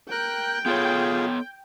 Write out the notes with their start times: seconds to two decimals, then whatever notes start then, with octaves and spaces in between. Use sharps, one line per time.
0.11 A#4 G5 F#6
0.66 B3 F4 G#4 A4 C#5